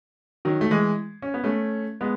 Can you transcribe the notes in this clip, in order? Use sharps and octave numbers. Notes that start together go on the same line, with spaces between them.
D#3 F#3
A3
E3 G#3
C#4
B3
A3 C#4
G#3 B3